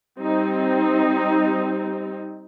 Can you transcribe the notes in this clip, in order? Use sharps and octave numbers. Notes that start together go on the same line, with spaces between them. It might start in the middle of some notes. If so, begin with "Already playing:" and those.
G3 C4 D#4